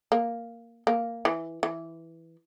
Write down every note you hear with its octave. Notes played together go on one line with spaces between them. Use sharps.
A#3
A#3
E3
E3